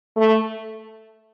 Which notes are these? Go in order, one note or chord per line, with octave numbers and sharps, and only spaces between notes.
A3